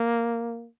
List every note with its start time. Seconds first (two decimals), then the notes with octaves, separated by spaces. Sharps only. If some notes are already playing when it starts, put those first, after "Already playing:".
Already playing: A#3